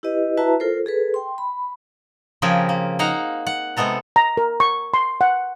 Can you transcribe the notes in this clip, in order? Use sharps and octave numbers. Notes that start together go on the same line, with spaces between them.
E4 G4 B4 D#5
E4 F#4 B4 E5 A5 A#5
F4 A4 A#4 C5
G#4 A4 B4
G5 C6
B5
C#3 F3 C4 G4 G#4 A#4
A#3
A#3 D#4 F5 F#5 A#5
F#5
C3 G#3 B3 A4 A#5
A#5
A#4
C#6
C6
F#5